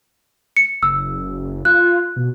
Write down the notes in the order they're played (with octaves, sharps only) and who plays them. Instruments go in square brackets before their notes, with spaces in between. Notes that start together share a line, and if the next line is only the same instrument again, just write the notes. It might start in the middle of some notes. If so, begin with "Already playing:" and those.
[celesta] C#7
[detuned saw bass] F#1 [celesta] E6
[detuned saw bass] F4 [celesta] F#6
[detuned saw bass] B2